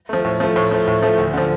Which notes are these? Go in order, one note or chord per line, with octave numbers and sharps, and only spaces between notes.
F3 A3
A2
F3 A3
A2
F3 A3
A2
F3 A3
D2
D3 F3